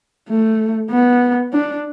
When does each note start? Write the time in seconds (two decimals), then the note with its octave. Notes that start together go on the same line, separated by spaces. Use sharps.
0.29 A3
0.91 B3
1.53 D4